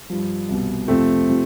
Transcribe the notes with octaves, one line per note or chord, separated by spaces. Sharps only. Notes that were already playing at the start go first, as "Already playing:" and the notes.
G2 F3
C2 B2
F2 C3 F3 A3 C4
C3 F3